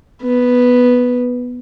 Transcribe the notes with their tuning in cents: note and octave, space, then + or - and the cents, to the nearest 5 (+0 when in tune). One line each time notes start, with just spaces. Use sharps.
B3 +0